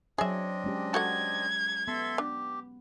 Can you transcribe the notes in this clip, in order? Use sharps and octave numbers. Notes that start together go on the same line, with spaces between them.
F#3 C4 D4 G#4 C#5 D#5 E5
G#3 C#4 G4
F#4 A4 F#5 G#6
B3 A4 E5 C6
D4 G4